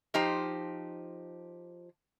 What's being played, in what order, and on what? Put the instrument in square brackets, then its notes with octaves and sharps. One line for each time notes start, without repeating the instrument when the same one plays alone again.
[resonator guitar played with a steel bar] F3 D#4 G4 C5